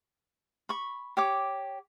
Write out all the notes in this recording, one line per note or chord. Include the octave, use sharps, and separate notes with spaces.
B5 C#6
G4 C#5 D6